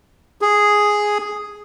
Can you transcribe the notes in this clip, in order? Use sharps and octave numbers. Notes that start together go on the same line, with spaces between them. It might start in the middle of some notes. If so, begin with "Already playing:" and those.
G#4